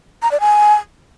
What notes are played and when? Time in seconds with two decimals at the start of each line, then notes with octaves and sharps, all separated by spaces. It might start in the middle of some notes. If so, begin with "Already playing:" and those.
0.22 A#5
0.31 D5
0.40 G#5